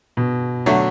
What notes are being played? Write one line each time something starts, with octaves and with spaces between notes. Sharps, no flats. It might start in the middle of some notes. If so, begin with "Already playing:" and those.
B2
D3 F#3 A3